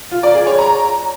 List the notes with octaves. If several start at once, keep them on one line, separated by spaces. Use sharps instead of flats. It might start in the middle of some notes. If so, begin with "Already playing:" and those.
F4
D5
G#4
C#5
A#5